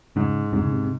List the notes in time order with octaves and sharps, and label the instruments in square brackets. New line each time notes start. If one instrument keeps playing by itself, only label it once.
[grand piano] G#2 [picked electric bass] C#3
[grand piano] G#2 [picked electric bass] C3
[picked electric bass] C#3
C3
C3